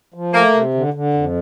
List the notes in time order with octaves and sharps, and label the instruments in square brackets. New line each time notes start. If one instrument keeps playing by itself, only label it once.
[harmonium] F3
[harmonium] A3 [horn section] A#3
[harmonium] C3
D3
D3
F2